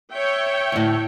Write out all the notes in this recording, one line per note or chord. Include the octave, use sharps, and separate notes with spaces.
C#5 E5 G5
D2 A2